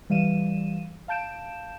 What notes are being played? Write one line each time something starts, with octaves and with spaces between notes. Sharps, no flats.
E3 G3 F5 D#7 E7
F5 A5 G6 D7 E7